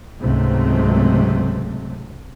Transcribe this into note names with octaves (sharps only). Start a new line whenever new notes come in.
C#2 G#2 C3 F#3 A3